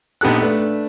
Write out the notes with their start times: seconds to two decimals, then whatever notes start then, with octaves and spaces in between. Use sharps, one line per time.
0.21 A#1 B3 D#4 G4 A4 F#6
0.41 A3 D4 B4